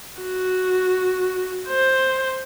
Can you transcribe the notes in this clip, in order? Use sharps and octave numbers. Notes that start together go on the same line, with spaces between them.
F#4
C5